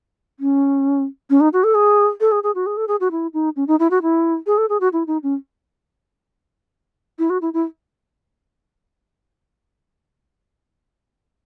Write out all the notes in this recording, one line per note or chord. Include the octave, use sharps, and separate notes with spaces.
C#4
C#4
D#4
F#4
A4
G#4
A4
G#4
G#4
F#4
G#4
A4
G#4
F#4
E4
D#4
C#4
D#4
E4
F#4
E4
G#4
A4
G#4
F#4
E4
D#4
C#4
E4
F#4
E4
E4